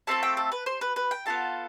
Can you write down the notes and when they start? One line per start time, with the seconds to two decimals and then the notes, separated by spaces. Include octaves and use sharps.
0.07 A3 C4 F4 A4 A5
0.23 G5
0.37 A4
0.52 B4
0.66 C5
0.81 B4
0.96 B4
1.11 G5
1.26 B3 F4 A4 A5